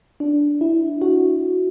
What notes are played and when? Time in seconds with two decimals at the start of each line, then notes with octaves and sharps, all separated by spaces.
0.20 D4
0.61 E4
1.02 F#4